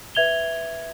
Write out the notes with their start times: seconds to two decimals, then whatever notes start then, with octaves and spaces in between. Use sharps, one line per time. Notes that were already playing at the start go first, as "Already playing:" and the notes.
0.15 B4 E5 G#6 F7 G7